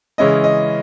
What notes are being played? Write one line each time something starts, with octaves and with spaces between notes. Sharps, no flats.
C#3 E3 G#3 C#4 E4 D#5
D#5